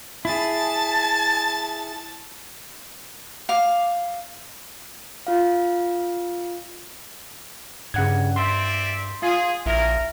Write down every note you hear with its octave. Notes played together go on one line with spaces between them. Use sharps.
E4 G#4 A5 A6
F5 D6
F4 F5
G2 C#3 F#5 G#6
C4 D5 E5 C6
F4 G#4
A#1 E4 A#4